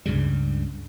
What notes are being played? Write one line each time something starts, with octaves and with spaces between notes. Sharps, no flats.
C#2 G2 C#3 G3